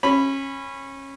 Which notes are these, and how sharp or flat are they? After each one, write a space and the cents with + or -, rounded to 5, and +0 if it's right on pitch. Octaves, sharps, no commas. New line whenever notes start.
C#4 -25 B5 +0